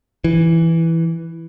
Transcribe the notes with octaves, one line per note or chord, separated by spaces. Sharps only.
E3